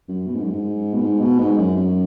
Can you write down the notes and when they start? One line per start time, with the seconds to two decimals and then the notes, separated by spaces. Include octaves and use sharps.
0.08 F#2
0.27 B2
0.35 G#2
0.42 F#2
0.51 G#2
0.94 B2
1.02 G#2
1.21 B2
1.39 G#2
1.58 F#2
1.76 F#2